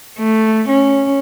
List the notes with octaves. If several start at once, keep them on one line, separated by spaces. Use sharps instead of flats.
A3
C#4